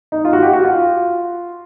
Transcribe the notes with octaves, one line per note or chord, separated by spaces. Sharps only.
D#4
F4
F#4
G4
F#4
F4